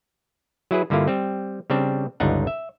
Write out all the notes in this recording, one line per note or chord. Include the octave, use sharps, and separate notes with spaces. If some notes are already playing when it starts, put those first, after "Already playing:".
F#3 E4 G#4 B4
G2 D3 A#3 E4 F4
G3 C4
C#3 G3 C4 D4
G1 C#2 D4 D#4 F#5
E5